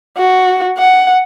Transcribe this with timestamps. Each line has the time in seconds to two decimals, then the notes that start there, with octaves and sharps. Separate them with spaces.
0.17 F#4
0.78 F#5